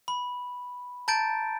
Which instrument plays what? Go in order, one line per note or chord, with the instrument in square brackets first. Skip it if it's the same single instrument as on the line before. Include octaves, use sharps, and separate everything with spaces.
[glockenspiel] B5
A5 A#5 G6 A6 D7